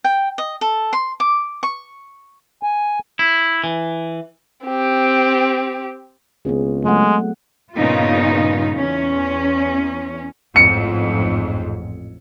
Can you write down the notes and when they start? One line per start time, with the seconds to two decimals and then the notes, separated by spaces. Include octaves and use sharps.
0.04 G5
0.38 D#5
0.61 A4
0.93 C6
1.20 D6
1.63 C#6
2.63 G#5
3.19 E4
3.64 E3
4.65 C4 G4
6.45 C#2 B3 C4 G#4
6.84 F#3 G#3 A3 F#5
7.77 G2 A#2 C#3 B3 D#4 F4
8.75 E2 C#4
10.56 A1 F2 G#2 C#7